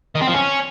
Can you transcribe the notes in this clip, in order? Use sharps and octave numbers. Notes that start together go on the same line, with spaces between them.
D#3
C4
F3
C#4